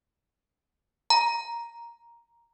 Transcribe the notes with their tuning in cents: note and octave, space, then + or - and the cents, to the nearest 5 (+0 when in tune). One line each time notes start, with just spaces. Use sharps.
A#5 +5